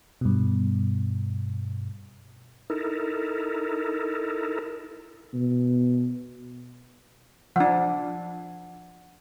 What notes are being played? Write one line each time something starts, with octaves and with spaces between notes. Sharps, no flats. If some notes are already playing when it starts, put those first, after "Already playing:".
G2 B2
D#4 E4 A4 A#4
B2
F3 D4 F#5